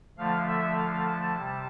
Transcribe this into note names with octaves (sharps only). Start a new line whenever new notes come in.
D3 F3 A3 F5
E5
F5
A5
C3 G3